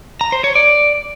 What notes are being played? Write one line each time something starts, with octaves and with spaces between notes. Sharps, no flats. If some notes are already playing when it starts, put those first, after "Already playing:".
A#5
C5
C#5
D5